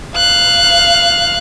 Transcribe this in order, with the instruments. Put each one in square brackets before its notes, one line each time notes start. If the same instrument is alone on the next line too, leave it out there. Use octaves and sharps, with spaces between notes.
[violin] F5 F#6